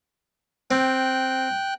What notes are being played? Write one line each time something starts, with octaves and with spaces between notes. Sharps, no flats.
C4 G5 F#6